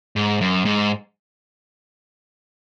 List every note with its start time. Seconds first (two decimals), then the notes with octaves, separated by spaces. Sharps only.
0.16 G#2
0.41 F#2
0.65 G#2